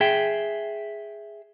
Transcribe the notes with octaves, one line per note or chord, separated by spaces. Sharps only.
G#4 E5 G5